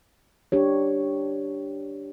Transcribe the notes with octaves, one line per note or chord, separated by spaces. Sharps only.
D4 G4 C#5